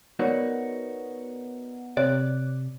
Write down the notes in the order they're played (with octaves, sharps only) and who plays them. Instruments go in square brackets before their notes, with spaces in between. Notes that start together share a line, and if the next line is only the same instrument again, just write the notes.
[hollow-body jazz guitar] B3 D#4 F#4 [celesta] A#4 C#5 D5
[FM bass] C3 [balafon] C#5 [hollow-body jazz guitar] D5 [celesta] F#6